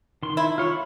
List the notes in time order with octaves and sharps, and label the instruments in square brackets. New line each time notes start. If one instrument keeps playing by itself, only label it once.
[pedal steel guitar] D#3 C6
[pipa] E4
[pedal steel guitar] F4 C#5
B5